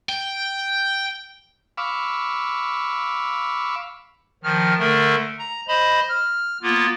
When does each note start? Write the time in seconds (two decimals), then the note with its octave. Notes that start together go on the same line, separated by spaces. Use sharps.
0.09 G5
1.78 F5 B5 C#6 D6 E6
4.43 D#3 F3 F6
4.79 D3 A3 A#4
5.39 A#5
5.68 C5 D#5 B5
6.09 F6
6.63 A#3 B3 F4